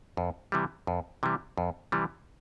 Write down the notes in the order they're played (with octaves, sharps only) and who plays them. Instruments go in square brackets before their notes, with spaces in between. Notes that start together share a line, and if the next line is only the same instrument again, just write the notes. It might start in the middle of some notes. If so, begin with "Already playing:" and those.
[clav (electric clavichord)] F2
C3 E3 G3
F2
C3 E3 G3
F2
C3 E3 G3